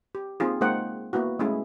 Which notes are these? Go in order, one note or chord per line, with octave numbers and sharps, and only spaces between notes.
G4
A#3 C4 D#4 F4 G#4
G#3 A#3 D#4 C5 F#5 G5
A#3 B3 E4 F#4
G#3 A3 C#4 E4 G#4